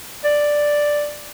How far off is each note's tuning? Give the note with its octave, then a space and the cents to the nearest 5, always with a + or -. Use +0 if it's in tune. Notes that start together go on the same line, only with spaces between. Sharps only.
D5 +5